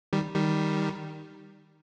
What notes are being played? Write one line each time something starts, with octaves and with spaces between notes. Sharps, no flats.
D#3 G3
D#3 G3